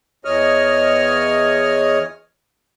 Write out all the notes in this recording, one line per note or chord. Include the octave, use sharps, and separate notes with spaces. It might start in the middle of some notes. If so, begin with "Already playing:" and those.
E2 C#5 D#5 F6